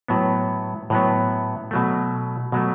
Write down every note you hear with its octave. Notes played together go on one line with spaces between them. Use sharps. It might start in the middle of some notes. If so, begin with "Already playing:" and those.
A2 F#3 B3
A2 F#3 B3
B2 F#3 A3
B2 F#3 A3